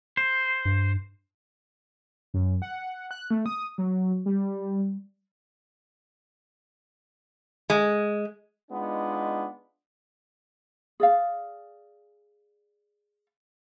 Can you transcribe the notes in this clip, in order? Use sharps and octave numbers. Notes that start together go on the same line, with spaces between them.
C5
G2
F#2
F#5
F#6
A3
D#6
F#3
G3
G#3
G#3 B3 D4 D#4 F4
G#4 D5 F5